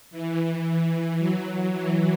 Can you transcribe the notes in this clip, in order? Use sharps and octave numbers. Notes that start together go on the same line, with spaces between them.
E3
F#3
E3